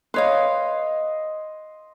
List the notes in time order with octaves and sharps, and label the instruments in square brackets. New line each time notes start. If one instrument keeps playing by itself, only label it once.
[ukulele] B4 C#5 F5 [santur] D#5 C6